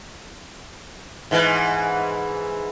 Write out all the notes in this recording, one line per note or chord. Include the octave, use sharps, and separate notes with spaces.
G#2 E3